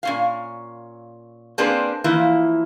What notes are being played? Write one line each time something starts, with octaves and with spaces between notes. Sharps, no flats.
A#2 C#4 F5
A#3 C4 D4 G#4 B4 C5
E3 F3 A#3 E4